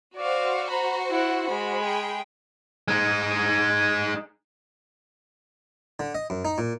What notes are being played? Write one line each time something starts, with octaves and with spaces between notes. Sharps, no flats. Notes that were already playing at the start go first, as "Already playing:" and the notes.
F#4 C5 D5 F5
A#5 B5
E4 F#5
G#3 B5
G#4 G5
G#3 D#4
D3
D#5
F#2
D#4
A#2